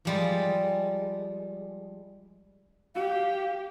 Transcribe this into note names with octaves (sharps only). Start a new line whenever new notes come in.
F3 G3 G#3
G4 F5